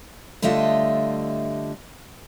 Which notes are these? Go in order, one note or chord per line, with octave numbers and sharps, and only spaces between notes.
D3 G3 A3 F4 D#5 E5